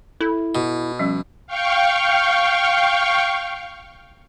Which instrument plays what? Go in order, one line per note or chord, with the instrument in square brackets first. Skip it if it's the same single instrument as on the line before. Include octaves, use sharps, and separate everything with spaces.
[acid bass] E4 [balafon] A4
[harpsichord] B2
[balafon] F3 G3 C#4
[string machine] F5 G5 C#6